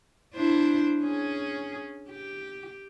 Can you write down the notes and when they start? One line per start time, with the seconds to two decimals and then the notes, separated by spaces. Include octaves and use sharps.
0.34 D4 E4 C5
1.00 C#4 G#4
2.09 G4